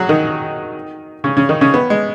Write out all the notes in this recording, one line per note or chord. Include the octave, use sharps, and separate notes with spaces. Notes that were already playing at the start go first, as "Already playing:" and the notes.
Already playing: F#3 F#4 G#4
D#3 D#4
C#3 C#4
C#3 C#4
D#3 D#4
C#3 C#4
B3
G#3